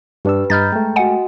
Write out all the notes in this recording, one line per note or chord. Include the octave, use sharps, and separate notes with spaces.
G2 D4 G4 B4 E6
G2 D#5 A#5 B5 F6 G6 A6
G#3 A3 G5
F#4 D#5 F#5 G#5